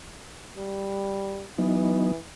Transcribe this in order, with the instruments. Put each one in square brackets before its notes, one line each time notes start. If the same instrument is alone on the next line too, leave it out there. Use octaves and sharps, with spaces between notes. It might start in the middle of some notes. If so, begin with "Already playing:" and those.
[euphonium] G3
[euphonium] E3 [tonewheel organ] F#3 B3 D#4